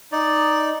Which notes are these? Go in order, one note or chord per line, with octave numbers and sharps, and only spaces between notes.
D#4 D5